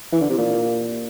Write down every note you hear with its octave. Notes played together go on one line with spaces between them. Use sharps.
E3
D3
C3
A#2